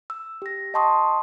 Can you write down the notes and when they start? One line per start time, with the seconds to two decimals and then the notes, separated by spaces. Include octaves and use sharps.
0.10 E6
0.42 G4 A#6
0.74 D#5 G5 A5 C6 C#6 D#6